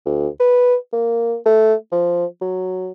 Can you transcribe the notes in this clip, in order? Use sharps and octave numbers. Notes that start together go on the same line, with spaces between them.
D2
B4
A#3
A3
F3
F#3